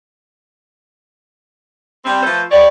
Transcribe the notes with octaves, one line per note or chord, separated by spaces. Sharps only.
G3 C4
F3 A3 A4 B4 C5
G4 B4 C#5 D5